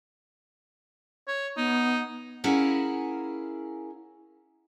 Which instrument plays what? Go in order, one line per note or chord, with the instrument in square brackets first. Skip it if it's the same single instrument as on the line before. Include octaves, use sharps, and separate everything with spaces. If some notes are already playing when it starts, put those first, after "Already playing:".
[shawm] C#5
[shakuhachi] B3 [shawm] D#4
[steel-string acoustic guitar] C#4 E4 G#4 A#4 F5 F#5